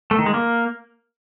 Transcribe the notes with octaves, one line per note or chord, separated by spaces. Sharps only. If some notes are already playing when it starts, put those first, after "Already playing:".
A3
D#3
G#3
A#3